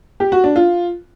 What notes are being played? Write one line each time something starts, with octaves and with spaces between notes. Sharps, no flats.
G4
F#4
D4
F4